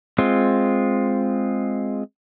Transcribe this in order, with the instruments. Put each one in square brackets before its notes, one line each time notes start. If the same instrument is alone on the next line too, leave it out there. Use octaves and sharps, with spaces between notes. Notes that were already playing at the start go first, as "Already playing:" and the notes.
[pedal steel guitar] G#3 C4 F4